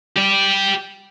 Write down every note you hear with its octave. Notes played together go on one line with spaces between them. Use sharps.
G4 D5